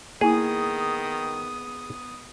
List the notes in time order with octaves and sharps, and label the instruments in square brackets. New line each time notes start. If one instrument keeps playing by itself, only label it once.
[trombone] D#3 [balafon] A#3 E4 [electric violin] B3 D#6 [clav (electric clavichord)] G#4